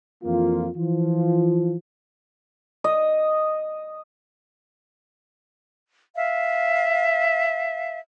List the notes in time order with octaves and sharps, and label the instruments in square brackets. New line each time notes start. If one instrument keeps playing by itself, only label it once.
[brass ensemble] F2 E3 A#3 F4
E3 F3 F4
[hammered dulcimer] D#5
[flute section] E5 F5